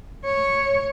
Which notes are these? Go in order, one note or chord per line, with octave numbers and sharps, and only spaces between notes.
C#5